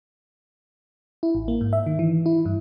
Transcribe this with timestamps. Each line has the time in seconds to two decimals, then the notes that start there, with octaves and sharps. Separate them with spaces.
1.23 E4
1.35 A1
1.48 A#3
1.61 G#2
1.73 E5
1.86 D#3
1.99 E3
2.26 E4
2.45 G2